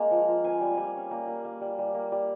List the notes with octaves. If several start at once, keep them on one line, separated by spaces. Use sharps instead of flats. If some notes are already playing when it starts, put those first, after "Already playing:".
Already playing: G#3 A#3 C4 A#5
F3
F3
C4 G#5
G3
G3
C#4
A#3
A#3
A#3
G3
G3
A#3
G3